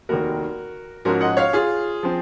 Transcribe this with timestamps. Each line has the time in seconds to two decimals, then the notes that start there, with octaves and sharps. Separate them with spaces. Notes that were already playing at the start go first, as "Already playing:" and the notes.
0.09 F1 D#2 D#3 F#4 A#4
1.05 G#2 F3 G#3 C#4 F#4 A#4
1.21 D#5 F#5
1.37 C#5 F5
1.53 F4 G#4
2.03 F3 C4